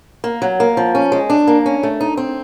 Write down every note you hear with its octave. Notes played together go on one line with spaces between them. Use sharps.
A#3
F#3
A#3
F3
C#4
G#3
D4
A#3
C#4
A3
D#4
C4